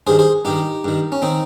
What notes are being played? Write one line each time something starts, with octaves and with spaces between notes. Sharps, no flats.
G2 D#3 G#4 C5
G#4 C5
G2 D#3 D#4 G4
G2 D#3
C#4
D#3 C4 D#4